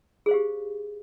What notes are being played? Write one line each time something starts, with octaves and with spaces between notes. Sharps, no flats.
G4 G#4 C5 F5